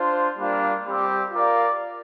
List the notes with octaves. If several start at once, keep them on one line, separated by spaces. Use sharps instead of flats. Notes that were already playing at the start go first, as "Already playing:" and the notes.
Already playing: D4 F4 C5
G3 A#3 D4 F4
G3 C4 G4
F4 A#4 D5 F5